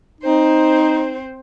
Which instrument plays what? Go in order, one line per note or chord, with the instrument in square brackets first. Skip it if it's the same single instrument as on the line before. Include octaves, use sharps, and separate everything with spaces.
[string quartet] C4 C5 [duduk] D#4